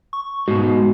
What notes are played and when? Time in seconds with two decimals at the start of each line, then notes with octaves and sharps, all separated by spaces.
0.13 C#6
0.48 G#2 B2 F#4